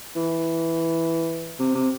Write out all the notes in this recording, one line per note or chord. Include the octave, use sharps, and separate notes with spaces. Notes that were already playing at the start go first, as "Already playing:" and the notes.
E3
C3
C3